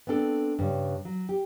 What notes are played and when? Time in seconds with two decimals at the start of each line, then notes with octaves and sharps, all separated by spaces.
0.07 B3 C4 D4 A4
0.59 G2 C#3
1.05 F#3
1.29 G4